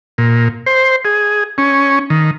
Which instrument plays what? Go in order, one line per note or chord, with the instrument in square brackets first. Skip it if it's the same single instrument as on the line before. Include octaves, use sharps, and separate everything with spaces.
[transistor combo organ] A#2
C5
G#4
C#4
D#3